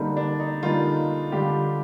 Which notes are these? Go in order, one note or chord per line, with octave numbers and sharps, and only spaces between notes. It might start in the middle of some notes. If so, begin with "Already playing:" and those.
Already playing: D3 G3 A#3 D#4
D4
D#4
D3 G3 A#3 D#4 F4
D3 G3 D4 F4 G4